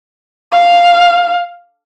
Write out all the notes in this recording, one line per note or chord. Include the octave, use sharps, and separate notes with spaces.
F5